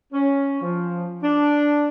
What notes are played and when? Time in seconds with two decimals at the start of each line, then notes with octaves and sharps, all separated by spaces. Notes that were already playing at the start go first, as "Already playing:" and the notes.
0.13 C#4
0.61 F3
1.23 D4